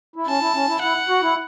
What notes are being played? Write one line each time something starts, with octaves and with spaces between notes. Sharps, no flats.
E4
C#4 A5
E4
C#4
E4
E4 F#5
F#4
E4